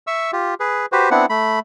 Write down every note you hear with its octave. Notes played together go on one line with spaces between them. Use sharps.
E5 C#6 E6
F4 G4
G#4 B4
F#4 G4 B4 C5
B3 C4 D4 E4 F#5
A3 B5